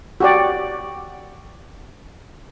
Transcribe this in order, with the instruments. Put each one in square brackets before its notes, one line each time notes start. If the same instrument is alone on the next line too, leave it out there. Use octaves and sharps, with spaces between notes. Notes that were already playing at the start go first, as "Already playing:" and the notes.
[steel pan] F#4 G4 D5